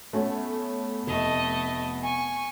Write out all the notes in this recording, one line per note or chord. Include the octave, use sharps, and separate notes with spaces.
A3 B3 C#4
F1 A3 D#5
G#5 C#6